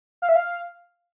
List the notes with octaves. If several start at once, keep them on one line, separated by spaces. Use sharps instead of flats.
F5
E5
F5